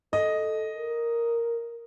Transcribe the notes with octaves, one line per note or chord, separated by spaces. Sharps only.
A4 D#5
A#4